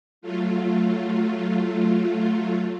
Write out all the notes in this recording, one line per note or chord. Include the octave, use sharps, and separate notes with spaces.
F#3 A3 F4